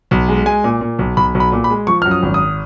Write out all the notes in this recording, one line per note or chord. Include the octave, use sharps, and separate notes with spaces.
B1
G#3
G#3 G#5
A#2
A#2
B1
B1 B5
B1
B5
A#2
B5
G#3
F3 C#6
F#2 F6
D#6
G#1
D#6